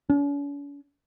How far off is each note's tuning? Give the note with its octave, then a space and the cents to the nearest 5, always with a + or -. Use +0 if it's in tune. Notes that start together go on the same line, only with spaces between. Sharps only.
C#4 +45